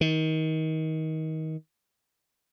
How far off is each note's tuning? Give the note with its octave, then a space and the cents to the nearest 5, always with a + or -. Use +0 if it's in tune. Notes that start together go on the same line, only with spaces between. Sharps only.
D#3 +25